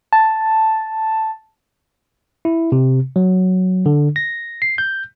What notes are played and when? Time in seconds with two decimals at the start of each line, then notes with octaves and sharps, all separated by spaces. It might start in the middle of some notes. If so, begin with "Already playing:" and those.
0.13 A5
2.45 E4
2.72 C3
3.16 F#3
3.86 D3
4.16 A#6
4.62 C7
4.78 G6